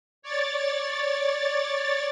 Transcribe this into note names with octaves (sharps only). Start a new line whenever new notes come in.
C#5 D5 A6